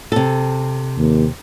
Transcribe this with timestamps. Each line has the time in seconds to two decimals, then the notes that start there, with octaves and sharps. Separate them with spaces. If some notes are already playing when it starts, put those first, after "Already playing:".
0.12 C3 A4
0.98 D#2